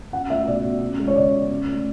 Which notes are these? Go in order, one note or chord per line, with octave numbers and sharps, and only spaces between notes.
C#4 F#5
A3 E5
B2 D5
B2
C#4
G#3
C#5
C#3 D5
C#3
C#4
A3